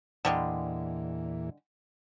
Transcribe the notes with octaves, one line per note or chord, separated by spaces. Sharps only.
E2 A#2 D3 E3 G3 G#3